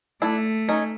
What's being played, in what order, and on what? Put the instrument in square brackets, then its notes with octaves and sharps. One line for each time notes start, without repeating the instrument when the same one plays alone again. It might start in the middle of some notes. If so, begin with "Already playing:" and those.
[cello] A3 [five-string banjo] D4 E4
[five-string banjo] C#4 D#4